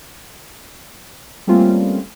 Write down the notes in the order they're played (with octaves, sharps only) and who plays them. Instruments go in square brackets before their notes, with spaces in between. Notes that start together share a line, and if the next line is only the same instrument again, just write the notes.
[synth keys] G3 A3 A#3 C4 C#4 F4